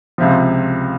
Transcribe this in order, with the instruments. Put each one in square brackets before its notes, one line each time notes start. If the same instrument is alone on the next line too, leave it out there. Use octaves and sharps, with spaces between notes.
[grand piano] C#2 C3 F3